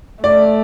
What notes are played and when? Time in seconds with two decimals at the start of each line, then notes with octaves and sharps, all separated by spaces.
0.23 A3 D5